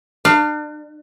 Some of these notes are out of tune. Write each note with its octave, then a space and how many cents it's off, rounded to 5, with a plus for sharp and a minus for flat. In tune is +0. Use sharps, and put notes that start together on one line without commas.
D4 +35 F5 +0